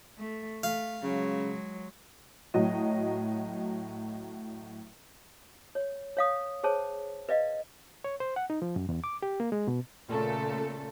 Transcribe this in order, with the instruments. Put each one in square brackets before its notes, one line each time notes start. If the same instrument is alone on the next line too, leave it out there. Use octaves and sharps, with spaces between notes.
[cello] A3
[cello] A3 [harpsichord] F5
[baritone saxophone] C#3 [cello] F#3 G#3
[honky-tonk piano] A2 F#3 D#5
[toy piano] C#5
C#5 F5 D#6
G#4 C5 C#5 A5
B4 D5 D#5 F5
[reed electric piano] C#5
C5
F#5
D#4
F3
F#2
E2
D6
G4
A#3
G#3
B2
[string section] A#2 C#3 A3 A4